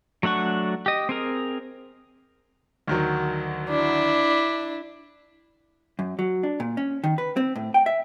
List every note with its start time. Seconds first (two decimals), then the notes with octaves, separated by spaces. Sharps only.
0.23 F#3 A3 D4 F#5 C#6
0.86 G4 D#5
1.09 C4 G#4 A#4
2.87 D2 D#3 F#3
3.70 D4 E4
5.99 F#2
6.19 F#3
6.43 D4
6.60 A#2
6.77 C#4
7.04 D#3
7.18 B4
7.37 C4
7.56 A2
7.74 G5
7.86 E5